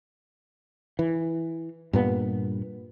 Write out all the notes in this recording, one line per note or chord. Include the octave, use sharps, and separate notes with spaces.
E3
G2 A#2 B3